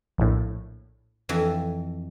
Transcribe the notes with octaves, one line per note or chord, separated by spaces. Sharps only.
A#1 A2
F2 E3 E5